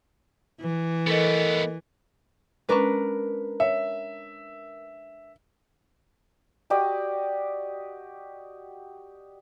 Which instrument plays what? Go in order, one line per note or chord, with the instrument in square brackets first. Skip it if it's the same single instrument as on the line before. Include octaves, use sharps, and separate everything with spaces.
[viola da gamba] E3
[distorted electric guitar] A3 B3 [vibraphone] A4 A#4 D#5
[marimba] G#3 C#4 [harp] D4 A#4 B4
[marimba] C#5 [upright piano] E5
[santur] F#4 G4 D5 D#5